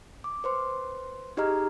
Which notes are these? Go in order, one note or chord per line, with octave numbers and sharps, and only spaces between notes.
D6
B4 C5 C6
D#4 G4 G#4 D#5 A#5 F6